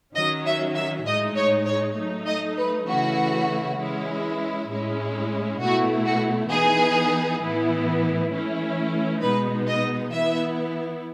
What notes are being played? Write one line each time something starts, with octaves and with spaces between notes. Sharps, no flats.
D#3 F#3 C#4 D#5
E5
E5
A2 G#3 D#4 D#5
C#5
C#5
F#3 A3 D#4
D#5
B4
C#3 E3 A3 C#4 E4 F#4
E3 G#3 C#4 E4
A2 G#3 C#4 E4
B2 A3 E4 F#4
F#4
E3 B3 D#4 G#4
A2 E3 B3 E4
E3 A3 C#4 E4
B2 G#3 B3 D#4 B4
D#5
E3 B3 E4 E5